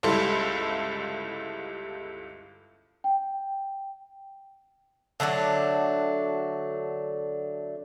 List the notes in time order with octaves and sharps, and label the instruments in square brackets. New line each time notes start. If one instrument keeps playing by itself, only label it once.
[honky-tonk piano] G1 C#2 G3 E4 A4 C6
[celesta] G5
[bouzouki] D3 F#3 A3 D4